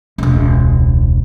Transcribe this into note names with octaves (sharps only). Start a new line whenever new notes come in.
E1 C#2